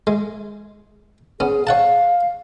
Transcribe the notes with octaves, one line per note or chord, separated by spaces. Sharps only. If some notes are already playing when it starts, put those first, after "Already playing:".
G#3
B3 C#4 G#4
C#5 F5 F#5 A5